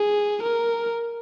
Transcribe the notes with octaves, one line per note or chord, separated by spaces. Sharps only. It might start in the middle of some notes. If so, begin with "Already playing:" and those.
Already playing: G#4
A#4